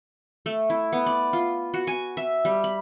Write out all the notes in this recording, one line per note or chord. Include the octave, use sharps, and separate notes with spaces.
A3
E4
B3
D5
F4
F#4
G#5
E5
G3
B5